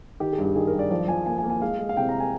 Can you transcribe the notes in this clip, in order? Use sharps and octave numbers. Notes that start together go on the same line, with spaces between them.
D#3 G4
G#4
G2
G4
D#3 G#4
A#4
G2
D5
F3 D5
F3 G#5
A#3 G#5
G#5
A#3
G#5
G#3 F5
G#3
F5
C3 G5
A#5
G#5